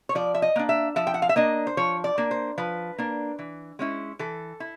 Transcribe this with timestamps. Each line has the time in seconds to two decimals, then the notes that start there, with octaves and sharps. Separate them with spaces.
0.09 C#5
0.15 F3 D5
0.34 E5
0.42 D#5
0.56 A#3 D4
0.69 E5
0.96 F3 E5
1.07 G5
1.14 F#5
1.22 F5
1.29 E5
1.36 A#3 D4 D#5
1.67 C5
1.77 F3 C#5
2.04 D5
2.18 A#3 D4
2.31 C5
2.58 F3 B4
2.98 A#3 D4
3.39 E3
3.79 G#3 C#4 E4
4.19 E3 A4
4.60 E4